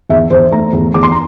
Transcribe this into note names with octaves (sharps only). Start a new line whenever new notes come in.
E2 E5
E2 C5
A3 A#5
E2
E2 D6
C6
A#5